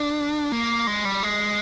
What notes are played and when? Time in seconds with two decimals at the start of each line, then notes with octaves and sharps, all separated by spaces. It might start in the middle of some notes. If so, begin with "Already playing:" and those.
Already playing: D4
0.52 A#3
0.87 G#3
1.05 G3
1.23 G#3